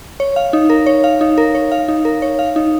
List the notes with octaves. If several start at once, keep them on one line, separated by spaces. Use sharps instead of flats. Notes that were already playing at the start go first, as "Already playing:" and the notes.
C#5
F5
D#4
A#4
C#5
F5
D#4
A#4
C#5
F5
D#4
A#4
C#5
F5
D#4